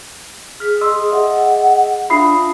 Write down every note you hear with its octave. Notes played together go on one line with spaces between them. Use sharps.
G#4 F6 B6
D#5 C6 D#6 E6
G#4 D#5 E5 F#5
D4 F4 E5 B5 D#6 C7